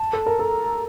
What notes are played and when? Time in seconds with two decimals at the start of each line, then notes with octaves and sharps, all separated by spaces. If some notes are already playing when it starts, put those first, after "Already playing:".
Already playing: A5
0.13 A4
0.26 A#4
0.39 A4 A#5